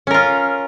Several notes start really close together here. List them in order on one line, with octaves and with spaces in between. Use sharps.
C#4 A#4 F4